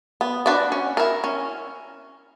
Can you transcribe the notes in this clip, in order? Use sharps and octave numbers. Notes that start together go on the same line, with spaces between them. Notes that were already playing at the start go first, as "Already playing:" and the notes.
B3
D4 F#4 B4 D5
C#4
E4 A#4
C#4